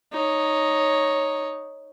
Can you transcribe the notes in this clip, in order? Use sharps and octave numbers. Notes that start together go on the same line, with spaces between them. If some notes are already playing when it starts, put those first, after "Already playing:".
D#4 C#5